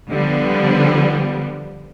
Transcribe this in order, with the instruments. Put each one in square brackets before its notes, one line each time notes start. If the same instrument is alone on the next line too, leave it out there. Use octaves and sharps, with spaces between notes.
[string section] D3 F3 G3 B3